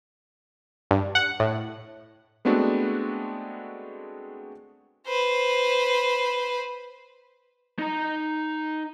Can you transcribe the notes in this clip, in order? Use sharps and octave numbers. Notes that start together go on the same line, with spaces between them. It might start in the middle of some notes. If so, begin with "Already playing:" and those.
G2
F#5
A2
G#3 A3 B3 C4 D4 F#4
B4 C5
D#4 A#5